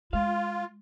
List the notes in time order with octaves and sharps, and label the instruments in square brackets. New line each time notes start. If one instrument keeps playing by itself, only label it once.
[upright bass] G#3 [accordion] F4 [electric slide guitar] F5